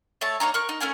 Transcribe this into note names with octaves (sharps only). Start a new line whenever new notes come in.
A3 C#5 E5 A5
A#3 D#4 C#5 A#5
A#4 C#6 F#6
D#4
A3 C#4 A#4 G#5